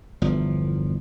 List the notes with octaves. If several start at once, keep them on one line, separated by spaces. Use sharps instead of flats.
G1 E2 F3